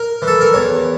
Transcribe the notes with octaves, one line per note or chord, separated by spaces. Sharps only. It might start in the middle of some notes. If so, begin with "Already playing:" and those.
Already playing: A#4
E3
A4
A#4
E2 C#5